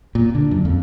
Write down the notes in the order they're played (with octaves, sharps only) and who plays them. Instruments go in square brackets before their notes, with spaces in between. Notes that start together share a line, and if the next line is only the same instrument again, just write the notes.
[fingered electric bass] A#2
D3
F#2
F2